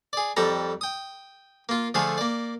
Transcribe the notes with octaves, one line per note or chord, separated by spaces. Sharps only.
G#4 D5
F2 G3 A4 A#5
G5 D#6
A#3 F4
D3 F3 A3 G#4 F5
A#3 D5